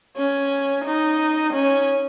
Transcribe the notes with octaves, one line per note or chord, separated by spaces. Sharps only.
C#4
D#4
C#4